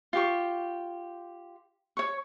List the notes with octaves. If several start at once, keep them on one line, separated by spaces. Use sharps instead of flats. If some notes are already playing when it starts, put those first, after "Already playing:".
F4 G4 C#6
C#5 C#6